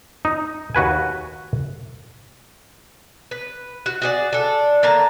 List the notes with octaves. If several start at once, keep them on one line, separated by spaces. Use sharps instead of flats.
D#4
D#2 F#4 B4 G#5
B4
F#4
F#4 G#4 D5
D4 A4
D3 A#3 A5 A#5